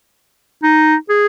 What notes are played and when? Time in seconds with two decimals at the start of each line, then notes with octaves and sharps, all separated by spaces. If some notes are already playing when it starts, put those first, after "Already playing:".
0.63 D#4
1.09 G#4